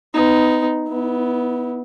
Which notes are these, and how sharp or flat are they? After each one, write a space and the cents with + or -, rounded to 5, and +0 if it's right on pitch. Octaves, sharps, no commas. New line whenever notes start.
B3 +30 D#4 +0
B3 +0 E4 -30